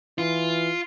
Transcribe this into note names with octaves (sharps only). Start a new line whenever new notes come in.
E3 F4